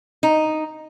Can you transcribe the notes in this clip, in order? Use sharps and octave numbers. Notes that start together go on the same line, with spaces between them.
D#4